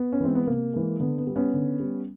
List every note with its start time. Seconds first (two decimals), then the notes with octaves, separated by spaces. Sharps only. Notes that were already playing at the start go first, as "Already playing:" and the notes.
Already playing: B3
0.12 C#4
0.20 E3 G#3 C4
0.35 B3
0.47 C3 A#3
0.73 E3 G#3
1.00 D3 B3
1.18 B3
1.27 G3
1.36 B3 C#4
1.54 D3
1.80 G3